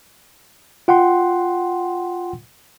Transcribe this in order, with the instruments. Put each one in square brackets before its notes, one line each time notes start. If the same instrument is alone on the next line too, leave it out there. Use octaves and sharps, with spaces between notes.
[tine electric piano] F4 F#5 G5 C6